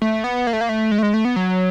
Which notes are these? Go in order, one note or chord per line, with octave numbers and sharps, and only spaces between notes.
A3
B3
A#3
A3
A#3
A3
G#3
A3
G#3
A3
B3
F#3